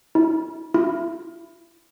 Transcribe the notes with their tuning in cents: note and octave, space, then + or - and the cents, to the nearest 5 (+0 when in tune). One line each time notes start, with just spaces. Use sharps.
E4 -25
E4 +30